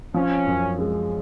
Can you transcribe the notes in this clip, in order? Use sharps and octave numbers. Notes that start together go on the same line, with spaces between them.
F3 C#4
F#2
G#3